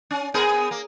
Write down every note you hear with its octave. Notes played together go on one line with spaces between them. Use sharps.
C#4
B3 G#4 A#4
A#3